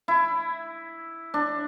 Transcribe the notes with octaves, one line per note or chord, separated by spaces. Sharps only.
E4
D4